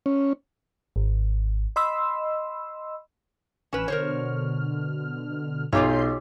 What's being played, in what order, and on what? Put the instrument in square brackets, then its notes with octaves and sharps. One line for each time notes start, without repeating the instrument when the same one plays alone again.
[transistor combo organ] C#4
[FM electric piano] G#1
D#5 B5 C6 E6
[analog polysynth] A1 G#5 E7 [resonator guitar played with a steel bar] C#4 B4
[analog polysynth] B2 D3 F6 [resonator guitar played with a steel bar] A#4 C5 C#5
[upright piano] B1 [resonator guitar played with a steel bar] F4 G4 C#5 [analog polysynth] C6 G6 C7